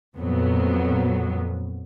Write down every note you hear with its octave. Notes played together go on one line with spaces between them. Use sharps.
F2 A#2 F#3 B3